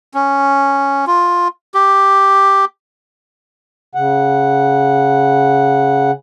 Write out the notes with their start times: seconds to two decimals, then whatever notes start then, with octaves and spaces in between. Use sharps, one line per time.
0.14 C#4
1.07 F4
1.74 G4
3.95 C#3 F#5